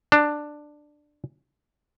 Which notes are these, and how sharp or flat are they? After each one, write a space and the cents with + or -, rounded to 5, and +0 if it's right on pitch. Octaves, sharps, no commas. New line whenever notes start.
D4 +10